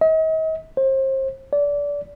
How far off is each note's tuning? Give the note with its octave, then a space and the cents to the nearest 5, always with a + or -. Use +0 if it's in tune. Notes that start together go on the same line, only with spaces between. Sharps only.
D#5 +40
C5 +35
D5 -25